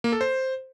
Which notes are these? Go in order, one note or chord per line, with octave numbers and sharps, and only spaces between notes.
A#3
A4
C5